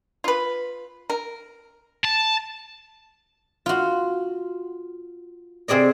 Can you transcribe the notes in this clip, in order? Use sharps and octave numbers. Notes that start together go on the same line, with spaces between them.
F4 B4
A#4
A5
F4 F#4
C3 C4 G#4 D5 D#5